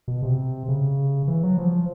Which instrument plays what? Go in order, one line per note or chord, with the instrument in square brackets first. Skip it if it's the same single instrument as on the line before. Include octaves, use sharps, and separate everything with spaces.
[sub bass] B2
C3
C#3
E3
F#3
F3